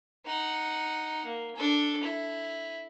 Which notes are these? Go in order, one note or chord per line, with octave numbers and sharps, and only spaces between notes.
D#4 F#5
A#3
D4 A4
E4